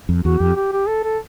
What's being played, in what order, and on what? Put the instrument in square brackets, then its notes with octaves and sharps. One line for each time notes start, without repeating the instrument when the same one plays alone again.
[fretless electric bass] F2
[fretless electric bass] E2 [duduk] F#4
[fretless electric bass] F2 [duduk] G4
[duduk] G4
G4
A4
A4